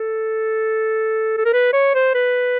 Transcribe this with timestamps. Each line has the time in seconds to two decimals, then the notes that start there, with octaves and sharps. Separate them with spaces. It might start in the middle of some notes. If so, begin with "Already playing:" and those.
Already playing: A4
1.37 A4
1.45 A#4
1.54 B4
1.73 C#5
1.95 C5
2.15 B4